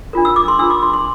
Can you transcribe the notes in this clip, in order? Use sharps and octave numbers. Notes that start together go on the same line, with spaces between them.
D4 F4 A#4
E6
D6
C6
D4 F4 A#4 E6
D6
C6
C6